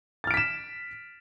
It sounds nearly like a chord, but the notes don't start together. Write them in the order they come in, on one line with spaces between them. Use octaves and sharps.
A6 F6 D7 B6 E7